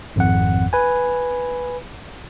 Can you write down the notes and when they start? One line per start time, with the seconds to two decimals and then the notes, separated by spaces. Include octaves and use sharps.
0.16 G#1 F2 F#5
0.73 B4 G#5